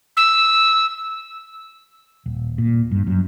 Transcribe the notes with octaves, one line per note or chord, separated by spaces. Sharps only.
E6
D#1
A#2
G2
F#2